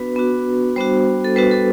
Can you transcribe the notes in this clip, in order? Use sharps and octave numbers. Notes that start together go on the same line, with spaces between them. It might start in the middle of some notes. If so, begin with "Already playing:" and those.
Already playing: B3 D4 F#4 B4
B3 D4 F#4
G3 B3 D4 F#4 C5
A4
G3 B3 D4 F#4 B4
A4